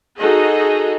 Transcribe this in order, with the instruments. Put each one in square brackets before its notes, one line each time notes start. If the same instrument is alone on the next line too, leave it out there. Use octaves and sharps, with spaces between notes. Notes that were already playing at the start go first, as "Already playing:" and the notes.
[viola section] D#4 F#4 G#4 A4 D#5